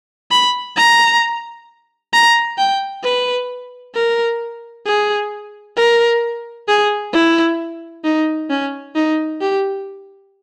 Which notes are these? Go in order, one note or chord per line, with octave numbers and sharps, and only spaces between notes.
B5
A#5
A#5
G5
B4
A#4
G#4
A#4
G#4
E4
D#4
C#4
D#4
G4